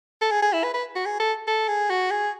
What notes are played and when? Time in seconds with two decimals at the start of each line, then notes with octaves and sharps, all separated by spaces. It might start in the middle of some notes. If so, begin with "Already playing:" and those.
0.21 A4
0.31 G#4
0.42 G#4
0.53 E4
0.63 B4
0.74 B4
0.95 F#4
1.06 G#4
1.19 A4
1.47 A4
1.68 G#4
1.90 F#4
2.11 G#4